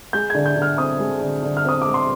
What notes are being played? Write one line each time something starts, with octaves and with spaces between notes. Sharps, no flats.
G#3 G6
D3 G#6
G6
D3
F6
C4 D#6
G#3
D3
D3
F6
C4 D#6
G#3 D6
C6